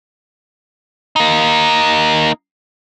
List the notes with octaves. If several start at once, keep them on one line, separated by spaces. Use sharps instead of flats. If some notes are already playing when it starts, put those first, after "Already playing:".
A#3 D#4